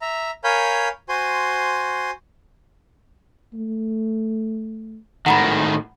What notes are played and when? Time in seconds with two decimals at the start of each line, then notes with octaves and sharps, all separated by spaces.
0.02 E5 A#5
0.44 A#4 C#5 F5 G#5 B5 G6
1.09 F#4 C5 G#5 C6
3.54 A3
5.26 G#1 A2 D#3 F#5 A#5 B5